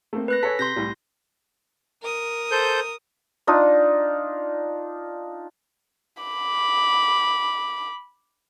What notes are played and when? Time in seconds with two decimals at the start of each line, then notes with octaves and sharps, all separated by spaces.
0.13 A3 A#3 C4
0.28 B4 F#6 A#6
0.43 A4 C#5 G#5 B6
0.59 C3 C6 G6 A#6
0.76 C2 A2
2.02 A#4 D#6
2.52 A4 C5 G6
3.47 D4 D#4 F4
6.23 B5 D6